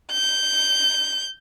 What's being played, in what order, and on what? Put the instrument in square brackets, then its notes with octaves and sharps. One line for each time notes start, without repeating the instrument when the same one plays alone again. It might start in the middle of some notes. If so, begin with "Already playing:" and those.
[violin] G6